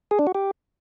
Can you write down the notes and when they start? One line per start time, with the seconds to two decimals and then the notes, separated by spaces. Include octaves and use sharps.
0.11 G#4
0.19 D4
0.27 F#4
0.35 G4